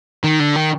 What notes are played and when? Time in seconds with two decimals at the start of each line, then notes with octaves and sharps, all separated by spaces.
0.24 D#3
0.40 D3
0.56 D#3